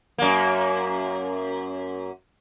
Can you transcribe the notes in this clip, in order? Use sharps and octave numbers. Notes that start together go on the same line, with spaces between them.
F#2 A#3